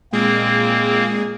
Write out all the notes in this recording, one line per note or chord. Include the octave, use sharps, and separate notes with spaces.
A#2 G#3 A#3 C4 G#4